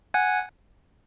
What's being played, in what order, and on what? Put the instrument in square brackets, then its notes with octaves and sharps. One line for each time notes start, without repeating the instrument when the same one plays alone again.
[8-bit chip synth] F#5 G#5